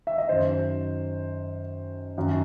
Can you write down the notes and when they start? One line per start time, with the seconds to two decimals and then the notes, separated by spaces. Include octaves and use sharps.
0.07 E5
0.18 D#5
0.29 F#2 D#3 C5
2.17 F#2 D#3